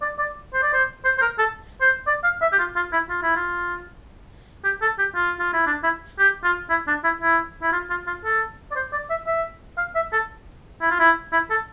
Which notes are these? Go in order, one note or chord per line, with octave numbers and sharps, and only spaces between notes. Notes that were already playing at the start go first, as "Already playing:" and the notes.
D5
D5
C5
D5
C5
C5
C5
A#4
A4
C5
D5
F5
E5
G4
F4
F4
E4
F4
E4
F4
G4
A4
G4
F4
F4
E4
D4
E4
G4
F4
E4
D4
E4
E4
E4
F4
F4
F4
A4
D5
C5
D5
E5
E5
F5
E5
A4
E4
F4
E4
E4
A4